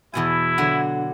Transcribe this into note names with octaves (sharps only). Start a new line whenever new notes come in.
E2 B2 E4 G#5
D3 F#3 G#5